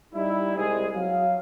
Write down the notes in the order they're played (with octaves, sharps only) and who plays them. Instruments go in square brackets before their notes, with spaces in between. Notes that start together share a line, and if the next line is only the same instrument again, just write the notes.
[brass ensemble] G3 D#4 E4
C2 G#3 C4 G#4
F#3 F5